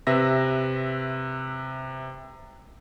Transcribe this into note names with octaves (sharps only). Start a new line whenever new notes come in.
C3 B4 E5 E6 A#6